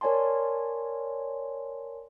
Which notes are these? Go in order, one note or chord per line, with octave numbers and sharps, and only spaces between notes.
A#4 C#5 D5 G#5 A5 C6